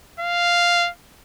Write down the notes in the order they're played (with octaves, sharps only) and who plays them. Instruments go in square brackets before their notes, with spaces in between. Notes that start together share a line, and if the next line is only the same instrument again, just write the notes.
[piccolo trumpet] F5